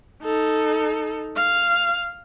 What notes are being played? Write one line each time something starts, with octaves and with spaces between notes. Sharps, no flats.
D#4 A4
F5